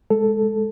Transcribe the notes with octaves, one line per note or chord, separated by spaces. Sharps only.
G#3 A4